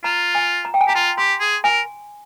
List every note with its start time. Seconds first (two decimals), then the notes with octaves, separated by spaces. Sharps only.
0.04 F4 A#5
0.35 G#5
0.65 A#5
0.74 G5
0.81 G#5
0.88 G4 A#5
0.95 F4 C6
1.18 G4 C6
1.41 G#4
1.64 A#4 G#5